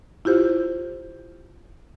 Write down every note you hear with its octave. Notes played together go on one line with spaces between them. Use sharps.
E4 F4 G4 C5